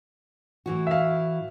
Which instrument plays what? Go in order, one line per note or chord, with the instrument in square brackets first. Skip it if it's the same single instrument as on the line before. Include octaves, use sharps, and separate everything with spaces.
[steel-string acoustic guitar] A2 E3 F#4
[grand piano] E5 F5